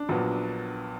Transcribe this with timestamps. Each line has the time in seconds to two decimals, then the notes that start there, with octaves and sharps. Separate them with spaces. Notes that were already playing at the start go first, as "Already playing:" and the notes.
Already playing: D4
0.09 A#1 A#2 F#3 B3